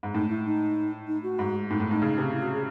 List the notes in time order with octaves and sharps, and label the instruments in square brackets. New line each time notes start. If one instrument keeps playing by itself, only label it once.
[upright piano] G#2
[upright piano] A2 [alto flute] D#4
[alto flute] E4
D#4
D#4
F#4
[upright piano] G#2
[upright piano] A2 [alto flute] D#4
[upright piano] A2
[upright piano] A2 [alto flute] D#4
[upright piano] C#3
C3
[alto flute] E4
F#4
G#4